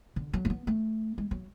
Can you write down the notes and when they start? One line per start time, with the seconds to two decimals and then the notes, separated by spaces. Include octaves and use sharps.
0.16 D3
0.33 F#3
0.45 A3
0.50 B3
0.67 A3
1.18 G#3
1.31 F#3